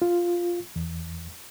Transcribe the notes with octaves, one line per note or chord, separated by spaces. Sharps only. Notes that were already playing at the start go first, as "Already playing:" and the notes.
F4
E2